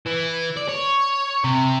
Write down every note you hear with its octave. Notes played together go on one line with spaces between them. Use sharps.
E3
D5
C#5
C3